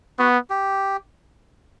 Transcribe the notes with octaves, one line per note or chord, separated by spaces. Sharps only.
B3 F#4
G4